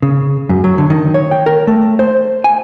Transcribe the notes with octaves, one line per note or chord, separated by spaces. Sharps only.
C#3
F#2
F#3
D3
D#3
C#5
G5
A#4
A3
C5
G#5